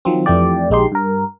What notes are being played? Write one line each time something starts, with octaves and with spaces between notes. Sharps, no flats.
D#3 F3 F#3 C4
F2 E3 A3 G4 D5
A#1 G#3 D#4 G4 C6
G2 A#4